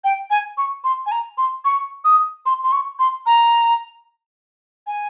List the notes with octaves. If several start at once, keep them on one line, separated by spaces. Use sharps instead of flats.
G5
G#5
C#6
C6
G#5
A#5
C6
C#6
D#6
C6
C6
C#6
C6
A#5
G#5